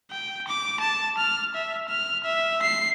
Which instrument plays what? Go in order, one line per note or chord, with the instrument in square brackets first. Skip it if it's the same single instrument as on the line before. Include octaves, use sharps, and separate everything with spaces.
[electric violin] G5
D6
A5
F6
E5
F6
E5
C7